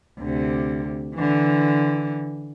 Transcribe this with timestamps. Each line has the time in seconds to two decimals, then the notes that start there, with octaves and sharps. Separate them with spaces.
0.19 D2 C3
1.15 D3 E3